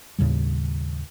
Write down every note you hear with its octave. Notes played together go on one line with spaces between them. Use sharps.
D#2 A2 C#3 G3